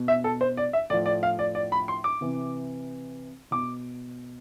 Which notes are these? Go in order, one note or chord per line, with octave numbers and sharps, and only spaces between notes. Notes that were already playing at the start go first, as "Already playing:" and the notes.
Already playing: B2
E5
A4
C5
D5
E5
A2 F3 D5
D5
F5
D5
D5
B5
C6
D6
C3 E3
B2 D6